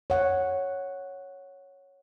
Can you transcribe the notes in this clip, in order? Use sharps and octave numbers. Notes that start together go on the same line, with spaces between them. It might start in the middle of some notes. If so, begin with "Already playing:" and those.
C#5 F#5